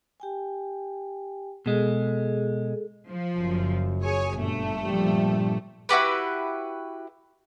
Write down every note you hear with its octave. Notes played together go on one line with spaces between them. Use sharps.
G4 G5 G#5
B2 G#3 G#4 A4
F3
F#1 F#2
G#4 C#5 G#5
G1 A#2 A3
F3 G3
E4 F#4 G4 B4